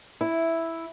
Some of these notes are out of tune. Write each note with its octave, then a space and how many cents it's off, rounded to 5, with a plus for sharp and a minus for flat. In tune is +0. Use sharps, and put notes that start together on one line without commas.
E4 +0